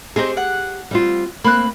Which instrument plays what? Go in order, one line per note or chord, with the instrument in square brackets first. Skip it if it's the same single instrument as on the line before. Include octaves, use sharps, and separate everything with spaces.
[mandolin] C4 D#4 C5 [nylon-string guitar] G4 G#4
[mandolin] F#5
[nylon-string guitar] G3 C4 F4
[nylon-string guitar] A#3 C4 [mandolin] B5 C6 F#6